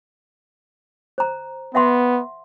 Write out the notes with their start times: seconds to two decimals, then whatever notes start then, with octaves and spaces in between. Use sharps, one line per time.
1.18 C5 A#5
1.75 B3 E5 F#5 C6